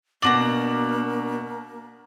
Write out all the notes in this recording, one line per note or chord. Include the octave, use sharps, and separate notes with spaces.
B2 A#3 D4 F#4 A#5 F#7